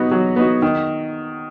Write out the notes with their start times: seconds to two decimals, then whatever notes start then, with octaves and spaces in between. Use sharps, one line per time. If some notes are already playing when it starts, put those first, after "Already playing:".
Already playing: F#3 B3 D#4 F#4
0.12 F#3
0.36 B3 D#4 F#4
0.62 D#3